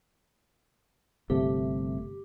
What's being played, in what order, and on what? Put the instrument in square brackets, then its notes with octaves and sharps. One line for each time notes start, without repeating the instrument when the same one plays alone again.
[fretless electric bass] G1 C3 A3 [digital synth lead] G4